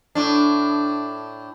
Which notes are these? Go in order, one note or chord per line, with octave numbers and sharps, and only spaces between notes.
A2 D4